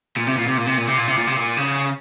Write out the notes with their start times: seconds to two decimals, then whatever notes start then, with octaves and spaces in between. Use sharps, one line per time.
0.17 A#2
0.27 C3
0.37 A#2
0.47 C3
0.57 A#2
0.66 C3
0.77 A#2
0.87 C3
0.97 A#2
1.08 C3
1.17 A#2
1.27 C3
1.37 A#2
1.58 C#3